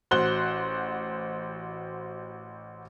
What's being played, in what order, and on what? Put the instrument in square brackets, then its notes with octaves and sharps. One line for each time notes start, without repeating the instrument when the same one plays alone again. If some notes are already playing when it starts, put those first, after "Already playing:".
[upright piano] A1 F#4 C5 C6 F#6 G7